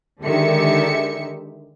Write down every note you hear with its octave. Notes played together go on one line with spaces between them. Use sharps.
D3 D#3 G#3 G4 E5 C#7